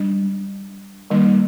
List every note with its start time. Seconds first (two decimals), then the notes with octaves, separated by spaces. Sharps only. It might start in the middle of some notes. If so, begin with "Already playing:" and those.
Already playing: G3 D4
1.10 D#3 G3 A#3 D#4